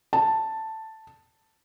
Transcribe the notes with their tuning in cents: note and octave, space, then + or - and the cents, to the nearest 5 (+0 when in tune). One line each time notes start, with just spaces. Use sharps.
A5 +5